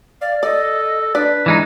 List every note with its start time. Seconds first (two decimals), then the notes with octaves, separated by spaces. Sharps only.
0.21 D5 F5
0.43 A4 D5 D#5
1.15 D4 B4 D5
1.46 E3 G#3 D#4